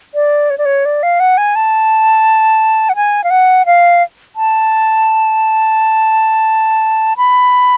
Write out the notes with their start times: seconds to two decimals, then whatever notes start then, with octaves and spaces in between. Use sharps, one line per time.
0.15 D5
0.50 C#5
0.58 D5
0.65 C#5
0.85 D5
1.03 F5
1.20 F#5
1.38 G#5
1.56 A5
2.89 F#5
2.96 G#5
3.24 F5
3.30 F#5
3.66 F5
4.36 A5
7.17 B5